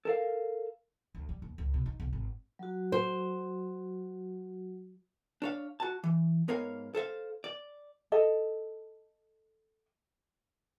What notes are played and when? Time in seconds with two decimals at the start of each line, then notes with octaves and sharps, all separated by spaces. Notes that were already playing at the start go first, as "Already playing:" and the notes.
0.05 A4 A#4 F5
1.15 D2
1.29 G3
1.42 D#2
1.58 C#2
1.74 B2
1.86 D#4
2.00 B1
2.13 G#1
2.59 F#3 F#4
2.92 C5
5.42 D4 C#5 F5
5.80 F#4 A5
6.04 E3
6.48 G#2 B3 A#4 C#5 F5
6.95 A4 C5 E5 F5
7.44 D5
8.12 A4 D#5